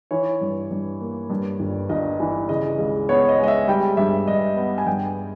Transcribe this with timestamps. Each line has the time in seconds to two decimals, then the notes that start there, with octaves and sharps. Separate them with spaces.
0.11 E3 C#5
0.41 G2
0.71 G2
1.01 A#3
1.30 G2
1.60 G1
1.89 G1 D#5
2.20 E3
2.49 C#3 D#5
2.79 C#2
3.09 B3 C#5
3.29 D#5
3.39 G#3 D#5
3.48 E5
3.68 G3 G5
3.97 G2 E5
4.28 G2 D#5
4.57 B3
4.78 G#5
4.87 G2 G5